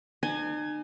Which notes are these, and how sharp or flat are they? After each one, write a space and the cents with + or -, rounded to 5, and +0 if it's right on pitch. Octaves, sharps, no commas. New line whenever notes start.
D#4 -45 G#5 +10